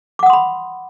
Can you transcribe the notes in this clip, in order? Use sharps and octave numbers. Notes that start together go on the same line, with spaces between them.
F#5 B5 C6 D6 D#6